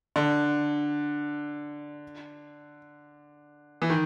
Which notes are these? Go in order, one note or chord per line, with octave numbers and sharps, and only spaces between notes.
D3
E3
D#3